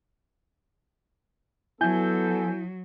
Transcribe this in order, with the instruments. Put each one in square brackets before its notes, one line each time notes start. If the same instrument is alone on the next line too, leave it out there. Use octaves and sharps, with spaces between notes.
[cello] F#3 [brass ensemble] B3 A4 [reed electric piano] E4 [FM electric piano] G#5 G6